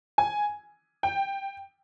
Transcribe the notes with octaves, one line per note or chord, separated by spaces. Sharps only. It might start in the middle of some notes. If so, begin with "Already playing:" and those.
G#5
G5